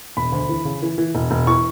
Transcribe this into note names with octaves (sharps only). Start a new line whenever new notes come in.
E1 B5
D2
E3
C#3
E3
E3
E1
E1
E3 C#6